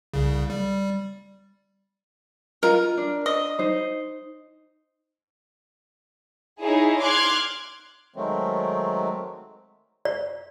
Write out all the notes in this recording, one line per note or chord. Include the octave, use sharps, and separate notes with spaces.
C2 C#3
G3
F4 A#4 D#5 A#5
D4
D#5
D#4 C5
D#4 E4 G#4 C#5
C6 D6 F6 F#6 G#6
D#3 F#3 G#3 A3 C4
D5